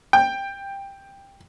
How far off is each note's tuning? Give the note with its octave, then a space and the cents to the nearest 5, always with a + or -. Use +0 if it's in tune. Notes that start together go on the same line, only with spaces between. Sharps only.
G5 +10